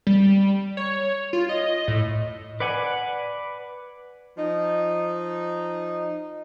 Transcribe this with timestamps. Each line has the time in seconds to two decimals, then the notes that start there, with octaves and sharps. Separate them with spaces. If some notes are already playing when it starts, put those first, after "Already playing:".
0.07 G3
0.77 C#5
1.33 F4
1.49 D#5
1.88 A2
2.60 B4 D5 F#5 G#5
4.38 F3 D#4